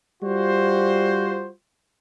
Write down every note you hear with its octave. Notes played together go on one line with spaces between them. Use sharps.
G3 F4 F#4 C5